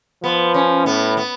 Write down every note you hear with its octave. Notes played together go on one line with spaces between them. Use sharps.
F3 B3
C#4
A2 B3
B3